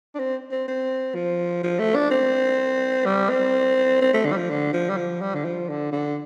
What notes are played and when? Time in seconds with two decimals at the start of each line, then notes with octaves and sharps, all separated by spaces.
0.15 D4
0.19 C4
0.51 C4
0.68 C4
1.15 F3
1.63 F3
1.79 A3
1.95 D4
2.10 C4
3.05 G3
3.30 C4
4.01 C4
4.13 A3
4.25 D3
4.32 G3
4.37 F3
4.50 D3
4.73 F3
4.89 G3
4.97 F3
5.21 G3
5.34 D3
5.45 F3
5.69 D3
5.92 D3